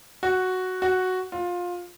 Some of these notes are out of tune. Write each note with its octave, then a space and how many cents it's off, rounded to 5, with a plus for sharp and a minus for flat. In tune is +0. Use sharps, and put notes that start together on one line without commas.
F#4 +0
F#4 +0
F4 +20